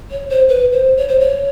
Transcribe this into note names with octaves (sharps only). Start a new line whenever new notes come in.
C#5
C5
B4
C5
C#5
C5
C#5